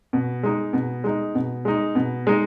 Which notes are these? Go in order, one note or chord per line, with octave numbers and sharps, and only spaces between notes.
B2
G#3 D#4
B2
G#3 D#4
B2
G#3 D#4
B2
G#3 D#4